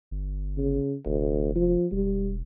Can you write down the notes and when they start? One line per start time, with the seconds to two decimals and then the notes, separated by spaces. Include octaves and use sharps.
0.11 G1
0.58 C#3
1.06 F1 D2
1.56 F3
1.92 E1 G3